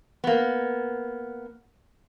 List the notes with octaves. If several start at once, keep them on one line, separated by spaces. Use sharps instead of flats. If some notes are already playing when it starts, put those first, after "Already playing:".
A#3 B3